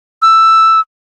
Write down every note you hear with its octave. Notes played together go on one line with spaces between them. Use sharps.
E6